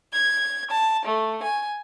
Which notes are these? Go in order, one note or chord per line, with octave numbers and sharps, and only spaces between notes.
G#6
A5
A3
G#5